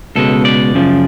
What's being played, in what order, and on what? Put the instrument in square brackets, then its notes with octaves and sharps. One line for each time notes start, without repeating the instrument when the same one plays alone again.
[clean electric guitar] C#2 B2 G#3 A4
D5
F#2 C#3 F3